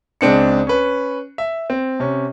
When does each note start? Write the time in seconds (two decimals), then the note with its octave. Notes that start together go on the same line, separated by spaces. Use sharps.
0.21 C#2 G#3 C4 D4 C#7
0.67 C#4 B4
1.38 E5
1.70 C4
2.00 C3 C#4